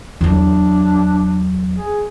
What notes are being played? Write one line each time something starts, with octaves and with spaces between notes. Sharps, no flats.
E2 F#3 D4
G#4